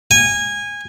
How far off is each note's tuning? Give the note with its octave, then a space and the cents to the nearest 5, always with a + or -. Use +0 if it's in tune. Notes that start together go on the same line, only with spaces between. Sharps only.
G#5 -20